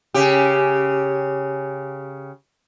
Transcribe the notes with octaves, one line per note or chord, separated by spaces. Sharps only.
C#3 G4